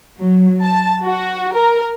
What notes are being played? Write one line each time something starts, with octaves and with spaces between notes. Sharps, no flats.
F#3
A5
F#4
A#4